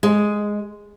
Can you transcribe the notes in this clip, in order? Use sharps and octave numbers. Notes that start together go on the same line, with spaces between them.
G#3